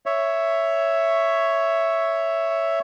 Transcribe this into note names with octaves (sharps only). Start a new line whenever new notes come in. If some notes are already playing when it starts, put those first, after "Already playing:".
C#5 E5